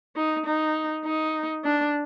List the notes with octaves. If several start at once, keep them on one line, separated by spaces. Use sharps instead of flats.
D#4
D#4
D#4
D4